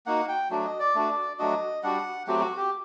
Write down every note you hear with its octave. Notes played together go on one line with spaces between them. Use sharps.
A#3 D#4 F#4 F#5
G5
F#3 A3 D4 F#4
D#5
D5
A3 D4 F#4
F#3 A3 D4 F#4 D#5
G3 D4 F#4 F#5
F#3 A3 C4 F#4 G4
F#4
G4